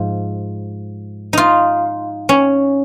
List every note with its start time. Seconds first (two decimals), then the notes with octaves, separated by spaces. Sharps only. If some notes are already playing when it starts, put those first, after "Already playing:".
Already playing: G#2 F3
1.33 D#4 F4
2.29 C#4